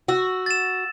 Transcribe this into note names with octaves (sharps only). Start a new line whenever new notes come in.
F#4 E6
A6 E7